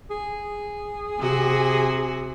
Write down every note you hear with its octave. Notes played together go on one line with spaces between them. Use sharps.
G#4
C3 F#4